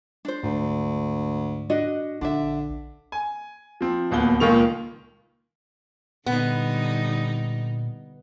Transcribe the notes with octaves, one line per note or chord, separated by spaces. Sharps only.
D4 C5
D2 G#2
D4 F#4 D#5
A#1 D3 D4 E5
G#5
F3 C4
D1 D#2 B3 G7
C#2 A#2 D#3 C#6 F7
A#2 D3 G3 B3 D#4